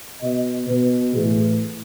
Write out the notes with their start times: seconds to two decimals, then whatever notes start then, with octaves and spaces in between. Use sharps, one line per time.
0.22 B2 D#5
0.68 B2 B4
1.14 A2 E3 G#4